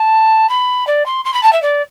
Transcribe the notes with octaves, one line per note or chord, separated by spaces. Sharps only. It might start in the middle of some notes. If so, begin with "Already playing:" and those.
Already playing: A5
B5
D5
C6
C6
B5
A5
E5
D5